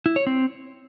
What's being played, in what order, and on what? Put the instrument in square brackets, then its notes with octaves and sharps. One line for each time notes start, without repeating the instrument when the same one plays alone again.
[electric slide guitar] E4
C#5
C4